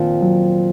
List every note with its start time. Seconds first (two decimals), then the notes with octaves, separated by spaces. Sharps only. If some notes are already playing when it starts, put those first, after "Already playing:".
Already playing: A#2 D#3 F3 C4
0.22 F#3